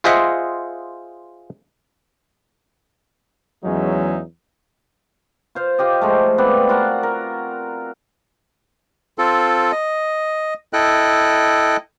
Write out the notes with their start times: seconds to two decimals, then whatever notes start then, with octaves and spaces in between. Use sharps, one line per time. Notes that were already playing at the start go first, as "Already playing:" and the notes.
0.04 F4 G#4 C5 D#5 E5 F#5
3.65 E2 F#3 G#3 C#4 D#4 E5
5.55 F4 C5 F5
5.79 F4 G4 D#5
6.01 F3 G#3 A3
6.38 B3 C4 B4 D5
6.69 F4 F#4 A#4 F#5
7.03 A#4
9.18 C4 F4 A4
9.72 D#5
10.73 E4 A4 D#5 G5 F#6